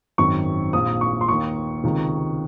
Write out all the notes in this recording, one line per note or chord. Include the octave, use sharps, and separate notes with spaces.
G#1 F#2 D#3 C#6
A#1 A#2 D#6
C#6
C6
D#2 D#3 C#6
C#2 C3 D#3